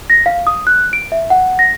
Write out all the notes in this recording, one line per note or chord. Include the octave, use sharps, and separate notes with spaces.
A#6
F5
D#6
F#6
D7
E5
F#5
A#6